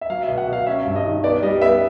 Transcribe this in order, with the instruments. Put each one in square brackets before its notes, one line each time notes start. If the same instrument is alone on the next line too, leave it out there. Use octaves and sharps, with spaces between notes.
[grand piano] E5
F#3 F5
E5
B2
F#5
B2 F5
C#4 E5
G2
D#5
D#3
B3 D5
G3 D#5
B3 E5